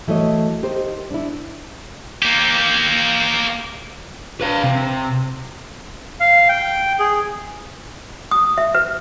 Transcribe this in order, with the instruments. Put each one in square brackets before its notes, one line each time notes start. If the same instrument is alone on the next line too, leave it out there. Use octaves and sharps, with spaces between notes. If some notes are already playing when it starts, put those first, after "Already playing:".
[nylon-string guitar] E3 A3 F#4 C#5 D#5
D#4 G4 A#4 C5
D4 E4
[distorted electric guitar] A#3 G4
[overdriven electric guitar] B4 F5
C3
[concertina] F5
G5
G#4
[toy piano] D#6
E5
B4